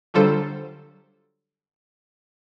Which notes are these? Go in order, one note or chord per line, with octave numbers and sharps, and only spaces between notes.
D3 F#3 G3 F4 A4 C5